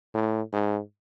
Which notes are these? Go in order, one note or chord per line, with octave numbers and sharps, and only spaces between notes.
A2
G#2